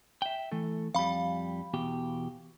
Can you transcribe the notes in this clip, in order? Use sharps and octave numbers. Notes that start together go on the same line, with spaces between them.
E5 G5
E3 A3 A4
F2 G3 F5 B5
E2 B2 G4